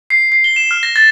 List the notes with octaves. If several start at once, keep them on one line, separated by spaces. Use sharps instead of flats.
C7
C7
G7
E7
F6
A#6
A6